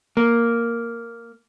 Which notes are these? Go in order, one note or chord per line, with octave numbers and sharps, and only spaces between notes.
A#3